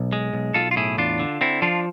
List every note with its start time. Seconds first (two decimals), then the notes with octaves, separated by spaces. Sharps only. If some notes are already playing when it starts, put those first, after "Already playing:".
Already playing: B1
0.13 G#3
0.33 B1
0.54 B1 F4 A4
0.71 F4
0.76 A2 E4 G#4
0.98 E2 D4 F4
1.19 D3
1.41 D3 C4 E4
1.62 F3 D4 F4